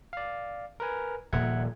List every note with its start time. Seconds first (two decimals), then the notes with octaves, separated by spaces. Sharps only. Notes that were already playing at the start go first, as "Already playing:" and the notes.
0.13 D5 F5
0.80 A#4 B4 G#5
1.33 D#1 A#2 F3 E5 F#5 G#6